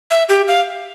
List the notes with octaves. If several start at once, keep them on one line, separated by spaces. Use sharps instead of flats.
E5
G4
F5